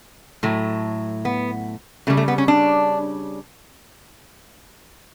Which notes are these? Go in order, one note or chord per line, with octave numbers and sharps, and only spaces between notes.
A2 F#3 A3
B3
C#3 G3 A3
A3
B3
C#4
D4